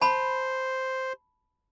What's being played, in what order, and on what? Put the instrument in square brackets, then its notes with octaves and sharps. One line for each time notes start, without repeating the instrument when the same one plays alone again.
[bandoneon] C5 [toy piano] A5 B5